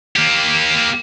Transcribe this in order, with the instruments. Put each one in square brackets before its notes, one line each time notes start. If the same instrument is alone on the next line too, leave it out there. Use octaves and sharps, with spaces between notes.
[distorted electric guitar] A#3 G4